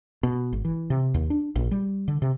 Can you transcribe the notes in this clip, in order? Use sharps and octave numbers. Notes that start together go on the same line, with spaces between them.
B2
G#1
E3
C3
D#2
D4
A#1
G3
D3
C3